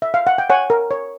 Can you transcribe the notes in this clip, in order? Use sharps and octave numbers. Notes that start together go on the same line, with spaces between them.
E5
F5
F#5
G5
C#5 F#5 G#5
A#4
C#5